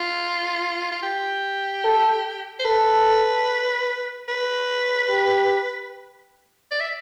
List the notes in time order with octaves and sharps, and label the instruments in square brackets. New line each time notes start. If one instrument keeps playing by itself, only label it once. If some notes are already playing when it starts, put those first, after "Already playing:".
Already playing: [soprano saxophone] F4
F4
G4
[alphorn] A4
[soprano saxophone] C5
[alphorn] A4 [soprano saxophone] B4
[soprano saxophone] B4
[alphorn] G4
[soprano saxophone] D5
E5